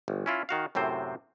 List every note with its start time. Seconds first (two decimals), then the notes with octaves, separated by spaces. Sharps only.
0.08 G1
0.26 C#4 E4 F4
0.49 D#3 F#4 F5
0.75 F#2 A2 C3 C4 C5